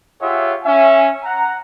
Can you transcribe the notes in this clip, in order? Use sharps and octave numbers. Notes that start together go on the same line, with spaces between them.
F4 G4 G#4 C#5 E5 F#5
C#4 E5 G#5
F#5 A#5